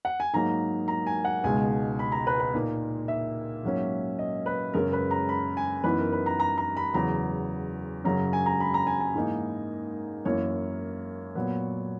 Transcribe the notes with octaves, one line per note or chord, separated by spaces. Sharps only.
F#5
G#5
G#2 F#3 A#3 D#4 A#5
A#5
G#5
F#5
C#2 B2 G#3 D#4 G#5
B5
A#5
B4
B4
A#2 A#3 D#4
E5
G#2 F#3 A#3 C#4
D#5
B4
F#2 C#3 G#3 C#4 A#4
B4
A#5
B5
G#5
F#2 E3 B3 D#4 B4
A#4
B4
A#5
A#5
A#5
B5
E2 C#3 F#3 A#5
F#2 C#3 F#3 C#4 A#5
G#5
A#5
B5
A#5
G#5
G#5
G#2 E3 A#3 D#4
F#2 E3 A#3 C#5
A#2 F#3 B3